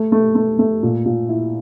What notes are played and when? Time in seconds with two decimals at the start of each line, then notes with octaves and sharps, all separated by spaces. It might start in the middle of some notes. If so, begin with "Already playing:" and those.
Already playing: A3
0.12 A3
0.35 A3
0.59 A3
0.83 A#2
1.06 A#2
1.29 E4